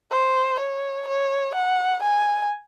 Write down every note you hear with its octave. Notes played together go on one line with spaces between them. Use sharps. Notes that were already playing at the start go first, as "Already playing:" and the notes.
C5
C#5
C#5
F#5
G#5